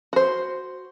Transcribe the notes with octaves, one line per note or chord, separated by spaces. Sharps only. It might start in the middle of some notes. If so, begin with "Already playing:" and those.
F#4 C5